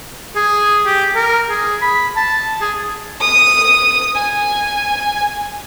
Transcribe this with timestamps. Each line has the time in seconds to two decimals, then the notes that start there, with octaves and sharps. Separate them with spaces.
0.36 G#4
0.86 G4
1.15 A#4
1.50 G#4
1.82 B5
2.17 A5
2.61 G#4
3.21 D#6
4.15 G#5